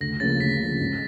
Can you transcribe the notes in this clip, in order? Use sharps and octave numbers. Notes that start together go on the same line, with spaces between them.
D2 A#6
C#3 F3 A#3 A6
D2 B6
C#3 F3 A#3
G#2